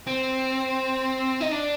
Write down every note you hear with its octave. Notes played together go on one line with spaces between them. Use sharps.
C4
D#4
D4